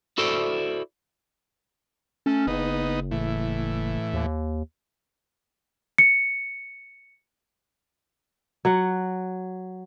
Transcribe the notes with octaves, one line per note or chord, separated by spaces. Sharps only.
E4 F#4 A4 C5 D5
A3 C#4
F#1 B3 D#4
A2 E3
D#2
C#7
F#3 F#5